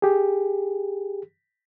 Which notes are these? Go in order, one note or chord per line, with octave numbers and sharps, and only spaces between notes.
G4 G#4